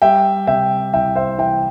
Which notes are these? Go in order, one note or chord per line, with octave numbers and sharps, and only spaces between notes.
G3 E5 G5
C3 E5 G5
C2 E5 G5
C5 E5
E3 E5 G5